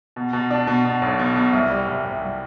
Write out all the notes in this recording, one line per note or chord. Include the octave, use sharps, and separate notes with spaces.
B2
B2
D4
B2
B2
B1
B2
B2
C2
G3
C2
C2
C2